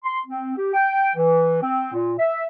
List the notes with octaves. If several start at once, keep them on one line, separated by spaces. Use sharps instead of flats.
C6
C4
G4
G5
E3
C4
A#2
E5